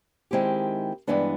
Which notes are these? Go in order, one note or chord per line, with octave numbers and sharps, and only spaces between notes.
D#3 G#3 C4 E4 G4
G2 E3 G#3 B3 D4